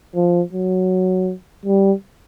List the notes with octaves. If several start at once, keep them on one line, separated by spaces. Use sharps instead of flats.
F3
F#3
G3